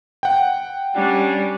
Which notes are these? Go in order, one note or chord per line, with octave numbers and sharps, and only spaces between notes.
F#5 G5
G3 C#4 D4